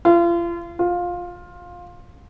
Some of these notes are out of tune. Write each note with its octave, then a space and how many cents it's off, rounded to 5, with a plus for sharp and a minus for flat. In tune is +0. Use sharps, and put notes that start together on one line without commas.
F4 -35
F4 +15